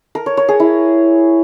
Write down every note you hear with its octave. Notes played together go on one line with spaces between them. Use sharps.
A#4
C#5
C#5
G#4
E4